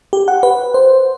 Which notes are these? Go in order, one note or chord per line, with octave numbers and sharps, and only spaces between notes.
G4
F#5
B4
C5